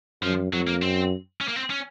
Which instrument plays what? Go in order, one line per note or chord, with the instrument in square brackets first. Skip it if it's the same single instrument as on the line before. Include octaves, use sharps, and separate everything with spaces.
[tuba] F#2 [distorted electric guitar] F3
[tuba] F2 [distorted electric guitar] F#3
[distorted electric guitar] A#3
[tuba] F#2 [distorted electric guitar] C4
[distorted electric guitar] C#4
A#3
C4
C#4